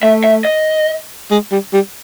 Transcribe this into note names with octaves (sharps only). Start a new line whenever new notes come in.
A3 E5
E5
D#5
G#3
G3
G3